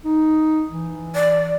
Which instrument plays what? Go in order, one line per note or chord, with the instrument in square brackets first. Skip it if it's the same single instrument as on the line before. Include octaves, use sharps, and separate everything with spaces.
[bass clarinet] D#4
E3
[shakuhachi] D5